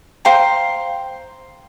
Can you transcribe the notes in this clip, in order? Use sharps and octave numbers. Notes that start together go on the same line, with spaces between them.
C5 F5 G5 A#5